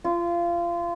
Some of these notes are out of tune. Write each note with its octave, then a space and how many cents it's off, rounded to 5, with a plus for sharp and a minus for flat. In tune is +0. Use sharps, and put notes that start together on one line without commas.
F4 -25